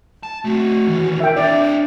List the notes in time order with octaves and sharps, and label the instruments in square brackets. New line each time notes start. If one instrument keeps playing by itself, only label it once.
[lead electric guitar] A5
[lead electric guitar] A3 C4 [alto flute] F#4
[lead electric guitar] D#2 E3
[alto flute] A#4 [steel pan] E5 G5
[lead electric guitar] D4 C#5 [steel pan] D5 [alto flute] E5